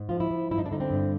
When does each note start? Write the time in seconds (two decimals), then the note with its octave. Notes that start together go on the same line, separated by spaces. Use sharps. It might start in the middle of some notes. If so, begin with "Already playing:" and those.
Already playing: G#2
0.09 F3 F4
0.20 E4
0.31 F3
0.51 G2 E4
0.58 D#4
0.66 D4
0.71 D3 D#4
0.80 C4
0.91 G2